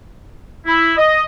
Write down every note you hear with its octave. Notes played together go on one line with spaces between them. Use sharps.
E4
D#5